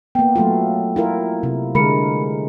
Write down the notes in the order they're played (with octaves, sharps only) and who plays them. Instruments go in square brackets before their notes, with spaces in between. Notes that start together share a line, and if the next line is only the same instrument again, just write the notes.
[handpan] A#3 B3 [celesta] G5
[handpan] F#3 A3 F4
E4 F4 A#4
C3
[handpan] D3 G#3 A#4 [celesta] B5 C#7